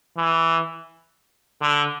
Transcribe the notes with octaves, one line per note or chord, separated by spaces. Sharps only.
E3
D3